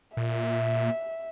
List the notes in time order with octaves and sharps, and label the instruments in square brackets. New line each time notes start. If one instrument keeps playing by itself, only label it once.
[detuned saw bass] A#2 [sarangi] E5